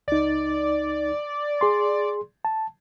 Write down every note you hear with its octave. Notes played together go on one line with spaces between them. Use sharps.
C#2 D#4 D5
G#4 C6
A5